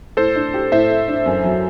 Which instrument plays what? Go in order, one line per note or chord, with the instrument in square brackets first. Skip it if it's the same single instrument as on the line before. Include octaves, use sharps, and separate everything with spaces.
[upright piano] A2 [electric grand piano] A4 C5
[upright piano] D4
G4
[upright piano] A2 [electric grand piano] C5 E5
[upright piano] A3
D4
F#2
F#3